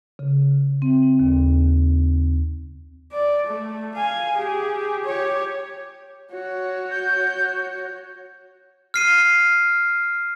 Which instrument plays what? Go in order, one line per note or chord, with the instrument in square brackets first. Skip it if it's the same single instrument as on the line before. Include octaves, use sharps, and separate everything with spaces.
[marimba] C#3
C4
D#2
[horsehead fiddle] D5
A3
F5 G#5
G4 G#4
G4 C#5
F#4 C#5
[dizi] G6
[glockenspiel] F6 C7 D#7